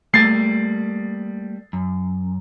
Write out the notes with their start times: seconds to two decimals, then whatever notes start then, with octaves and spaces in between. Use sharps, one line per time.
0.14 G3 A3 A#3 A6 C7
1.73 F#2